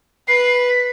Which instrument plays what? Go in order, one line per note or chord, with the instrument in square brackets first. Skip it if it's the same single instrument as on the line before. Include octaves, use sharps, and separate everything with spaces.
[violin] B4 [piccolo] C7
[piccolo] B6